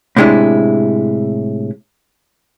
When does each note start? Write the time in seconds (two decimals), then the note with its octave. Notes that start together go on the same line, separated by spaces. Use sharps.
0.17 A2 C3 G#3 D4 E4